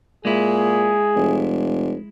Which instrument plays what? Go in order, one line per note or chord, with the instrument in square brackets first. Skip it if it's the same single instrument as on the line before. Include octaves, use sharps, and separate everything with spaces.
[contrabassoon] A#2 [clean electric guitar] G#3 E4 [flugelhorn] G#4
[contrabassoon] F1